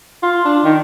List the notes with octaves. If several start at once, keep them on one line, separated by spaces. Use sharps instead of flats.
F4
D4
D#3